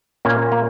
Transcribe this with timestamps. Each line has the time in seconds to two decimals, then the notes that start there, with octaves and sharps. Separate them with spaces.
0.25 A#2 A#3 C#4
0.52 A#3